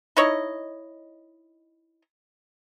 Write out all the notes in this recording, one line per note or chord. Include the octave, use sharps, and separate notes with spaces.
D#4 E4 C#5 D#5